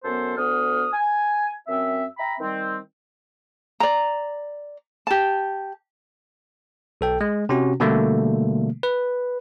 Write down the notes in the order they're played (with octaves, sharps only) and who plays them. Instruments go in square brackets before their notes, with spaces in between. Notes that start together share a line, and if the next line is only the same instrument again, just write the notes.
[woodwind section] F#2 B3 A4 C5
D2 B3 D#6 F6
G#5
F#2 C4 E5
E5 G5 A#5 B5
D#3 G3 C4
[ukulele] D5 A#5
G4 A5
[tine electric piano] B1 A4 G5
G#3
C3 C#4 F#4
B2 D3 G3 A3 A#3
B4